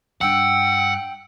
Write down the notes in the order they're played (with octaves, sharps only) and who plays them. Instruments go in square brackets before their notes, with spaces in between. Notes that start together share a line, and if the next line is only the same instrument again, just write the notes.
[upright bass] G2 D4 [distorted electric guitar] F#5 [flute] G5 [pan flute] E6